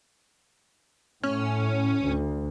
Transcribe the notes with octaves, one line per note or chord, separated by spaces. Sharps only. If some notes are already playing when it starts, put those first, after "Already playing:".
A2 C#4
D2